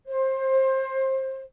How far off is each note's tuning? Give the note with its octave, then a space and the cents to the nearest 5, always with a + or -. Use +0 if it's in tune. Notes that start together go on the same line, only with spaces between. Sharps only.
C5 +25